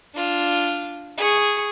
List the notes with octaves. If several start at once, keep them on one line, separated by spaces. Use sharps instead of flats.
D4 F4
G#4 C#6